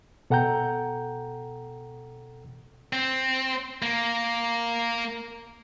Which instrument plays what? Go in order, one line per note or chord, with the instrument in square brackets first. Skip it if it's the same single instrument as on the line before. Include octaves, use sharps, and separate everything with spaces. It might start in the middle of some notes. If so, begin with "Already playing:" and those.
[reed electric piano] B2 A4 F#5 G5 A#5 G6
[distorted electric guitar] C4
A#3